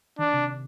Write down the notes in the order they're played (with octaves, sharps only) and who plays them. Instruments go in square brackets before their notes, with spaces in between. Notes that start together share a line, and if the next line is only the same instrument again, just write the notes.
[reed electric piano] D#3 [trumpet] D4
[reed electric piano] C3